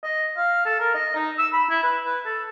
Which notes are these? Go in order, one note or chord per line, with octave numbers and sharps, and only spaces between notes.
D#5
F5
A4
A#4
D#5
D#4
E6
B5
E4
B4
B4
A4